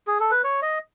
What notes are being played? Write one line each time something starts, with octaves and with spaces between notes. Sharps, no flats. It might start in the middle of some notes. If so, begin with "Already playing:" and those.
G#4
A4
B4
C#5
D#5